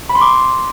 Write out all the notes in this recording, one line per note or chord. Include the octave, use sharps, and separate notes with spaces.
B5
C6
D6